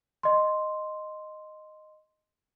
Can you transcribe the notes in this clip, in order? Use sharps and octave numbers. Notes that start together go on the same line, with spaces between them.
D#5 C6